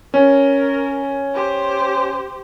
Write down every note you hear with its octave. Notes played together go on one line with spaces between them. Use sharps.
C#4 A#4
G4 C5